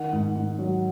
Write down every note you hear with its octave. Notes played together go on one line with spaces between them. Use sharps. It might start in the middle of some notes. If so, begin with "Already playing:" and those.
Already playing: D#3 F#5
G#2
G#2
F#3